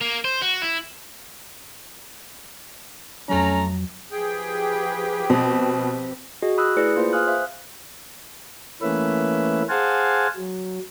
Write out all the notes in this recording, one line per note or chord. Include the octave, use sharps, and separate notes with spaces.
A#3
C5
F#4
E4
F2 F#3 A3 C#4 A#5
F3 G4 G#4 B4 G5
B2 C4
F#4 G#4 D#5
B5 D#6 E6 F#6
A3 E4 G#4 B4 D5 C#7
A#3 F4 G#4 B4 C5
F5 G#5 D#6 F6 F#6
C5 E5 F5
E3 A3 A#3 C#4 B4 E5
G#4 C5 F5 F#5 G#5 A5
F#3